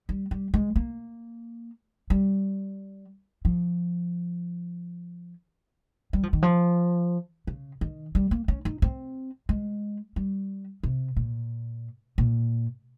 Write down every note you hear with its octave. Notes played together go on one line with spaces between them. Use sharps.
G3
G3
G#3
A#3
G3
F3
G3
F3
D#3
F3
C#3
D#3
G3
A#3
C#4
D#4
C4
G#3
G3
C3
A#2
A#2